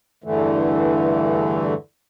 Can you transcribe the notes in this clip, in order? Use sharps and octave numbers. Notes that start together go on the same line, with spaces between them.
E2 G2 D3 E3 A3